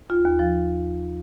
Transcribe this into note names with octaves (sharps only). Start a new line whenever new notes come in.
D#2 F4
D#2
F3